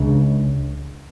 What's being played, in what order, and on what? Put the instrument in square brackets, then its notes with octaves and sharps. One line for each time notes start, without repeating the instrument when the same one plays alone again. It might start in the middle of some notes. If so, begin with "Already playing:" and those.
Already playing: [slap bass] C#2 C#3 D4